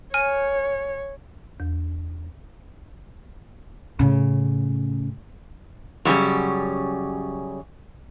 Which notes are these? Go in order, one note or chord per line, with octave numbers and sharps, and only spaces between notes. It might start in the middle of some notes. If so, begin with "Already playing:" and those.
C#5 G#5 F6
E2
A2 C#3
F#2 C#3 G3 C#4